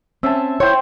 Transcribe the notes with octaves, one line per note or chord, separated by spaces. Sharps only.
C4 C#4 E5 A5
E4 C5 C#5 G5